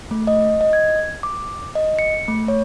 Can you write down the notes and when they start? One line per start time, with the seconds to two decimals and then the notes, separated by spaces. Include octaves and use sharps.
0.11 A3
0.27 D#5
0.61 D#5
0.73 G#6
1.23 D6
1.75 D#5
1.99 C#7
2.28 A3
2.48 C#5